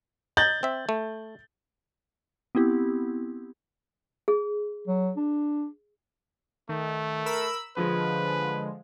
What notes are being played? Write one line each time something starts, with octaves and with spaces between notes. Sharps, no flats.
D#5 A#5 G6 A6 F#7
C4 E5
A3
B3 C4 E4 G4
G#4
F#3
D4
D#3 A3
A#4 B5 E6
D3 F3 G#3 B4